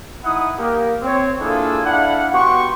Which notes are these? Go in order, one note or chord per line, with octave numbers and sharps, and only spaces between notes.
D#4 E4 F#5 D#6
A#3 G4 A#4
C4 C#5
A#3 D4 E4 F4 G#4 A4
D4 E4 F5 F#5
B3 F#4 G4 C6 C#6